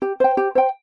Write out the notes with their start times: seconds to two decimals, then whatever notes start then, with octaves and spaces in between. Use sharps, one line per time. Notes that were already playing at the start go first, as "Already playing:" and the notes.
0.02 G4
0.20 C5 G5
0.37 G4
0.55 C5 G5